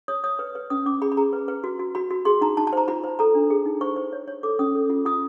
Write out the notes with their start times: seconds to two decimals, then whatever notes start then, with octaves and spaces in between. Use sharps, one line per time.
0.08 C#5 D#6
0.24 C#5 D#6
0.39 B4
0.55 B4
0.70 C#4 D#6
0.86 C#4 D6
1.01 G#4 B5
1.12 B5
1.17 G#4 A#5
1.33 B4
1.48 B4
1.64 F#4
1.79 F#4
1.95 F#4 B5
2.11 F#4
2.25 G#4 C6
2.41 D#4 A#5
2.57 D#4 A5
2.67 A5
2.73 C5 A#5
2.88 F4 B5
3.04 C5
3.19 A4 A#5
3.35 D4
3.50 G#4
3.66 D#4
3.81 C5 C#6
3.96 C5
4.13 C#5
4.28 C#5
4.43 A4 D6
4.59 C#4 D#6
4.75 A4
4.90 F4
5.05 F4 D#6